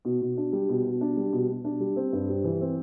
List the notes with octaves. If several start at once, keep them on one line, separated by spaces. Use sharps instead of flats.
B2
B2
D4
G3
B2
B2
D4
G3
B2
B2
D4
G3
C4
G2
G3
E3
C4